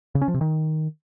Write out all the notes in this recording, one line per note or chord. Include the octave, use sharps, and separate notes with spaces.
C#3
C#4
F3
C3
D#3